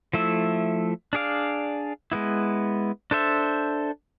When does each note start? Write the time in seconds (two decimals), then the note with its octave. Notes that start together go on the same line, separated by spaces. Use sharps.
0.13 F3 A3 E4 A4 E5
1.13 D4 G#4 D5 F5
2.12 G#3 B3 E4
3.11 D4 A4 C5 E5